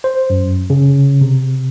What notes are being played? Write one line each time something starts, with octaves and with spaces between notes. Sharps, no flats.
C5
F#2
C#3
C3